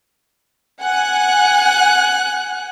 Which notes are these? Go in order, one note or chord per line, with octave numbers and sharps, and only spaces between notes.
F#5 G#5 F#6